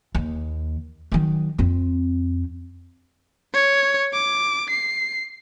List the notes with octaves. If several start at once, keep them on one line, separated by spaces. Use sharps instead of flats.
D#2
D#3 F#3
F2 C4
C#5
D6
C7